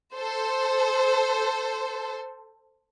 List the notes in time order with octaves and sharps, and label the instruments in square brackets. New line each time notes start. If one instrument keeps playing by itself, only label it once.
[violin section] A4 C5